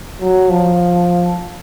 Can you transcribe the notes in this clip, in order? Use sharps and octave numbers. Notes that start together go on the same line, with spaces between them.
F#3
F3